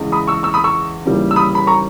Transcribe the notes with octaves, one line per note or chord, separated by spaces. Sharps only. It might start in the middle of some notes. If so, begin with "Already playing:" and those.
Already playing: E2 C#3 G#3
B5 D#6
C#6 E6
C#6 E6
B5 D#6
C#6 E6
D#2 C#3 E3 G3
E6
B5 D#6
B5
A#5 C#6